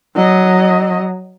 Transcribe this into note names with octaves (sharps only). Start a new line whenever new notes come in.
F#3 D#5